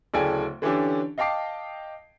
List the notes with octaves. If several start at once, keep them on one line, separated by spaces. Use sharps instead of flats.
D1 C#3 A4 D5 G5 G#5
D3 E3 C#4 D4 G4
D#5 F5 G5 A5 D6 C7